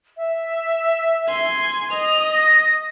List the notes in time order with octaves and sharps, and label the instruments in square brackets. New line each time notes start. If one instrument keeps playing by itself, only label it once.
[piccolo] E5
[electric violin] G#5 C6
[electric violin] D#5 [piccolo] F7
[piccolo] A#6